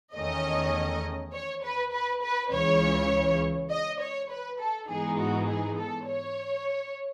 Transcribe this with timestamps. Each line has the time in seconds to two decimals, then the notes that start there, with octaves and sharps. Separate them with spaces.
0.15 E2 D#3 A3 C#4 D#5
1.33 C#5
1.63 B4
1.92 B4
2.22 B4
2.52 C#2 C#3 E3 C#5
3.70 D#5
4.01 C#5
4.30 B4
4.59 A4
4.88 G#2 E3 G#3 B3 D#4 G#4
5.18 F#4
5.48 G#4
5.77 A4
6.07 C#5